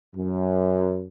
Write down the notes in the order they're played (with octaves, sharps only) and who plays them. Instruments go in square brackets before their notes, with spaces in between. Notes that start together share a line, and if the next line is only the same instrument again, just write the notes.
[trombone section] F#2